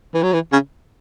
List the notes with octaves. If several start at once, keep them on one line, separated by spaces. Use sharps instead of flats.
E3
F#3
E3
C#3